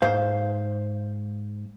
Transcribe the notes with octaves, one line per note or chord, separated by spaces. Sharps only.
G#2 C5 F5